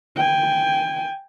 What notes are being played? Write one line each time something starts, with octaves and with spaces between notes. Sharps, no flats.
G5 G#5